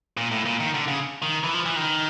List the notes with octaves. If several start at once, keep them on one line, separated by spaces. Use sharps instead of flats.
A#2
A2
A#2
D#3
D3
C#3
D#3
E3
F3
E3
D#3